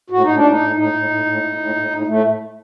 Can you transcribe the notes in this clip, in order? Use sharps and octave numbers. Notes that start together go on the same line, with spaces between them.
A2 F#4
A2 D#4
D4
A2 D#4
A2
A2 D#4
A2
A2
A2
A2
A2
A2
A2
A2 A3